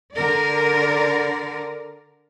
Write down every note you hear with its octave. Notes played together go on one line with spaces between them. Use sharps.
D3 A#4 D5